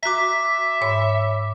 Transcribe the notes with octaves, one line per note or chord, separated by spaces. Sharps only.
F#4 E5 A#5 D6 B6
G#2 C#5 B5